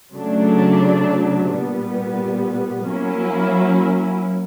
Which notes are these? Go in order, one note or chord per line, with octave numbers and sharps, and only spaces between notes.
C#3 F#3 A3 D4
A#2 G3 B3
F#3 A#3 C#4 E4